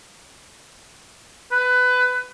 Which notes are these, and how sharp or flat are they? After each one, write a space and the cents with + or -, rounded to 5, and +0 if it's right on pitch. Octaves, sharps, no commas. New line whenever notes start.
B4 +20